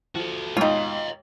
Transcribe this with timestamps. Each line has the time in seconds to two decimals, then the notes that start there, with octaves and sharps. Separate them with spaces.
0.15 F3 F#4 A4
0.57 D#2 G#2 B2 D#4 F4 C#5 D#5